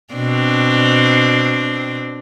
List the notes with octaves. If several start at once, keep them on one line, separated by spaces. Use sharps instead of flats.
B2 C4 D4